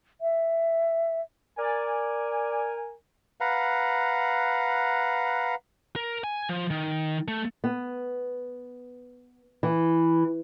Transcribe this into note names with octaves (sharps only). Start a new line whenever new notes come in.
E5
A#4 D5 G#5
B4 F5 F#5 A#5
A#4
G#5
F3
D#3
A3
B3
E3